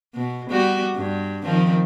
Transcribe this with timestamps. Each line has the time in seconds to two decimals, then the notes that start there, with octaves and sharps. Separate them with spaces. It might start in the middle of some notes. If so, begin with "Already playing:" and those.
0.15 B2
0.50 G3 B3 F#4
0.95 G2
1.43 D#3 F3 C4